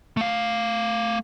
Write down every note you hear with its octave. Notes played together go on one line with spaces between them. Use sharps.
A3 F5